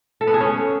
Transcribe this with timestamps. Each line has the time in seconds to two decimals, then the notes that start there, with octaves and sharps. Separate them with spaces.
0.21 A4
0.27 B3
0.34 G#4
0.40 C#4